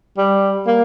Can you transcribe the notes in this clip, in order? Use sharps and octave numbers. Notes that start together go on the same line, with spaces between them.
G3
A#3